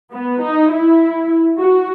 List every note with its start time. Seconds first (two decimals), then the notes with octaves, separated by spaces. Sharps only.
0.13 B3
0.42 D#4
0.71 E4
1.59 F#4